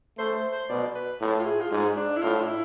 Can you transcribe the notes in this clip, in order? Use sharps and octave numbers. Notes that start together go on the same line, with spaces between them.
A3 C5
C5
C5
B2 D5
B4
A2
F4
G#4
F4
G#2 G#4
D4
E4
A2 F4
D4
E4